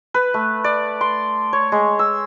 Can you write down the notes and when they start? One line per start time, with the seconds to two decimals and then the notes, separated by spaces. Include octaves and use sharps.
0.14 B4
0.34 A3
0.64 D5
1.01 C6
1.53 C#5
1.72 G#3
1.99 E6